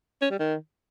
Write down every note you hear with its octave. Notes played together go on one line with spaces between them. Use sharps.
C#4
G3
D#3